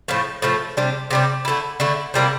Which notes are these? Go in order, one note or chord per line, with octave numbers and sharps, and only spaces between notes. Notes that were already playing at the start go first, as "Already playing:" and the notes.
A2 F3 A3
A2 F3 A3
C3 G3 D4
C3 G3 D4
D3 A3 E4
D3 A3 E4
C3 G3 A#3 E4